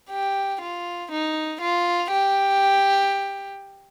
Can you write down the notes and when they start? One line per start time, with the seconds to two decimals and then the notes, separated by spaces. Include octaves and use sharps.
0.10 G4
0.61 F4
1.11 D#4
1.61 F4
2.12 G4